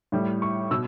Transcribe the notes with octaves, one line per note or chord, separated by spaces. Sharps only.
A2 G3
C#6
B2 E6